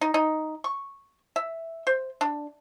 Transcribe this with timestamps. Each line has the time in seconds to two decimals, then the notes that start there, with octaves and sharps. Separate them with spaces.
0.01 D#4
0.14 D#4
0.64 C#6
1.36 E5
1.87 C5
2.21 D4